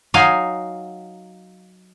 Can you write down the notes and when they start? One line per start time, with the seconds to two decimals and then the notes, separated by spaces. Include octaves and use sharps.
0.14 F#3 D#4 F5 G#5